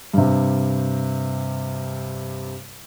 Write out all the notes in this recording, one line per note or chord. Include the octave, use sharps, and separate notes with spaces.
G2 C3